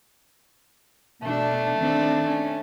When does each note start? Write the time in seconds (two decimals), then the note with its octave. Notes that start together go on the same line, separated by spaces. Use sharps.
1.23 B2 A3 D4
1.78 D#3 C4 D4
2.27 C#4